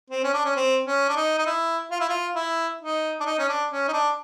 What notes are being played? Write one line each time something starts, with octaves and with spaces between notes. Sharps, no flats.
C4
C#4
D4
C#4
C4
C#4
D4
D#4
D#4
E4
F4
E4
F4
E4
D#4
D4
D#4
C#4
D4
C#4
D#4
D4